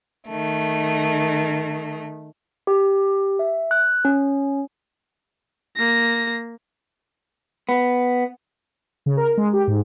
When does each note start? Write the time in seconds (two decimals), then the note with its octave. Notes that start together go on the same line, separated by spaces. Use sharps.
0.28 D#3 A3
2.67 G4
3.39 E5
3.71 F#6
4.05 C#4
5.76 A#3 A#6
7.69 B3
9.06 C#3
9.17 A#4
9.37 G#3
9.53 G4
9.67 G#2